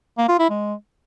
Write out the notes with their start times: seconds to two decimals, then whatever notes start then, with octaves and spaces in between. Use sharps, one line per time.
0.18 A#3
0.29 F4
0.39 E4
0.50 G#3